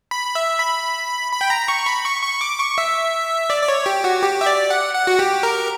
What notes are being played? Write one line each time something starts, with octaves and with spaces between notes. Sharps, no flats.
B5
E5
B5
B5
G5
A#5
C#6
B5
C#6
C#6
D6
C#6
E5
D5
D5
C#5
G4
F#4
G4
E5
D5
F#5
F#5
F#4
G4
A#4